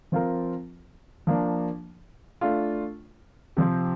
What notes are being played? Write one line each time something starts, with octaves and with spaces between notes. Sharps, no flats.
F3 C4 F4 A#4
F3 A#3 D4
A3 D4 F4
C3 F3 C4